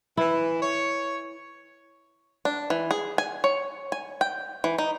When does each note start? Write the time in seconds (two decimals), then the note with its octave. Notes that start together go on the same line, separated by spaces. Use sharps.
0.17 E3 E4
0.59 C#5
2.45 D4
2.70 E3
2.91 G#4
3.18 G#5
3.44 C#5
3.92 G#5
4.21 G5
4.64 E3
4.78 D#4